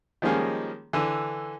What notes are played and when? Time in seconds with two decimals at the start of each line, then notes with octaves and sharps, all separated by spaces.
0.22 D#3 F3 G3 G#3 A#3 C#4
0.93 D3 E3